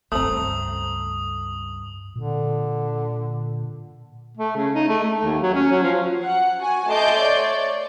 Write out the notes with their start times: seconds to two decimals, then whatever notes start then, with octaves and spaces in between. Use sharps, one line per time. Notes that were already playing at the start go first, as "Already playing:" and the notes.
0.12 C#2 G2 A3 C4 A#5 D#6 F#7
2.16 A#2 D3
4.37 A3
4.56 C#3
4.75 D#4
4.89 A3
5.03 A3
5.24 D#2
5.42 F#3
5.54 C#4
5.71 F#3
5.83 F3
6.25 F#5
6.60 F#4 G#5
6.89 A3 D#5 A5 C6 D6 G6
7.19 C#5 D5